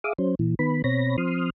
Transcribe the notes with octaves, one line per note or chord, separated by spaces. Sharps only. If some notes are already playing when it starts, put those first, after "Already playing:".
G#4 E5 F5 D6 D#6
F#3 C#4 C5
A#2 E3
D#3 B3 B5
B2 C4 C#5 B5 A#6
F3 C4 C6 D#6 F6